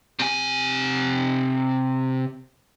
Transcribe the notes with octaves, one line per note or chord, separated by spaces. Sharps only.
C3 G#5